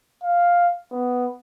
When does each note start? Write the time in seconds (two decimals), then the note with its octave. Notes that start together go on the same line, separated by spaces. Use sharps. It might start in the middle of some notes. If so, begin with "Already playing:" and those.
0.23 F5
0.92 B3